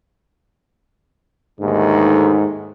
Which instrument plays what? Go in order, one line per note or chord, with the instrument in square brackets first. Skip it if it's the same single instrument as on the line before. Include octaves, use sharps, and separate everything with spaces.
[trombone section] D#2 D3 A3 [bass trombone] G#2